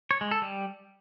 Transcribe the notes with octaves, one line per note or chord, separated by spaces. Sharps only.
C#5
G#3
A4
G3